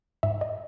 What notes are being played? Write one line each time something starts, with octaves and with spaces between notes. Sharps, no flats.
G#2 E5
D#5